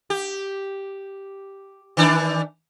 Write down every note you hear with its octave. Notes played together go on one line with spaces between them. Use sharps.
G4
D#3 E3 D4